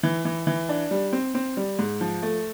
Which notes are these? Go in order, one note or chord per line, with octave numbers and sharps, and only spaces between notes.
E3
E3
E3
D4
G3
C4
C4
G3
G#2
F3
A3